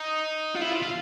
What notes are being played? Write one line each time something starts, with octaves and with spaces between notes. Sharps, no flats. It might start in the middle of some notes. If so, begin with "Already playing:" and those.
Already playing: D#4
F4
E4
F4
F4